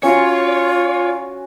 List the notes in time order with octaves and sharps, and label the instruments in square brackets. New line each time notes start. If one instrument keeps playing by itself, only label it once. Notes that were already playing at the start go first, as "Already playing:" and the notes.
[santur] C#4 F#4 [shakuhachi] F4 [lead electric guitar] C#5